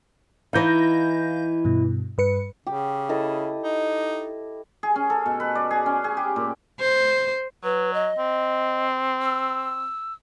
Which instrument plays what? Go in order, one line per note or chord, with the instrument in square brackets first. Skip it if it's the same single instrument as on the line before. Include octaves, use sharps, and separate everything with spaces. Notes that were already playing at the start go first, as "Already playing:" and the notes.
[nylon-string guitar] E3 D#4 [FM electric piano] F5 G6 A#6
[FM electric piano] G2 B2
G2 B4 C#7
[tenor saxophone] C#3 [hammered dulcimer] G4
[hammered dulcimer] E4 A4 D#5
[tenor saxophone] D#4
[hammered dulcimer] G#4
C#4
A4
B2
B4
D5
G#4
C#4
G#4
G4
A#2
[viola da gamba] C5
[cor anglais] F#3 [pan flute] B4
[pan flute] D#5
[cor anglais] C4
[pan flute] E6